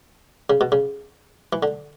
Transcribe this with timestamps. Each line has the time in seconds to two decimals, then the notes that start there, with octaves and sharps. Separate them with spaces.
0.50 C#3
0.61 B2
0.72 C#3
1.53 E3
1.63 D3